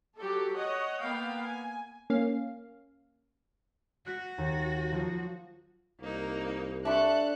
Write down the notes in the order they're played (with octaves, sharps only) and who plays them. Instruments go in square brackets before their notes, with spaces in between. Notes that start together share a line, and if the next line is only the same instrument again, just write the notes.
[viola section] F#3 G4 A4
C#5 D#5 F#5
A#3 B3 F5 G5
G#5
[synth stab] A#3 C#4 F5
[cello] F#4 [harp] F#6 B6
[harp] D#2
F3 F#3 F4
[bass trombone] C2 [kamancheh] A#3 D#4
[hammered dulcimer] D4 C#6 [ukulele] G4 E5 A5 [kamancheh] A4 F#6